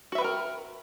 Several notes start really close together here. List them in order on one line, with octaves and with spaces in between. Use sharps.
F#4 E5 B4 G5 A#4